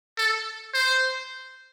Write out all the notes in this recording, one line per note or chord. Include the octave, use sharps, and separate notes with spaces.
A4
C5